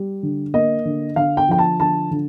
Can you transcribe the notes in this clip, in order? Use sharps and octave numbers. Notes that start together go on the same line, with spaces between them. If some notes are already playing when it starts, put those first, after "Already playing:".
Already playing: G3
D3
A#3 D#5
D3
D3 F5
G5
F3 G5
A5
D3 A5
D3